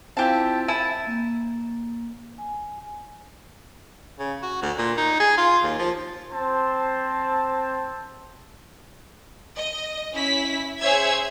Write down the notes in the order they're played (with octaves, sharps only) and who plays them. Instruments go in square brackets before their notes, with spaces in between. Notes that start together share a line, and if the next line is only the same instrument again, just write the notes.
[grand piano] C4 E4 F4 [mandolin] G4 A5
[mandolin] E4 A5 [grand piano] D#7
[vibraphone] A#3
G#5
[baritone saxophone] C#3
F#4
D2
A#2
D#4
G#4
F4
D#2
F3
[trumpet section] C4 C5 A5
[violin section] D#5
C#4 E4 B6
G#4 C5 C#5 E5 E6 G#6